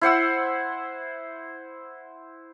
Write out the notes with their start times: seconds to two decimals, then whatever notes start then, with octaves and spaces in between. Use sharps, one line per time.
0.01 E4 C5 F#5 E6